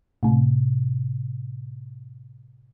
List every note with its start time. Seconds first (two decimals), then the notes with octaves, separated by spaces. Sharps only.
0.23 A2 C3